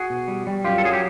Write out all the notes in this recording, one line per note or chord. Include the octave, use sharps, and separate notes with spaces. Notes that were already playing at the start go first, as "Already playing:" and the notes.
Already playing: F#4 G#4
B2
G3
G3
F#2 F4 G4
A4
F#3 G#4
G4